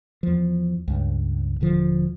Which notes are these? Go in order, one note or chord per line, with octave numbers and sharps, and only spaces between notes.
E2 F3
C#2 G2
D#1 D3 F3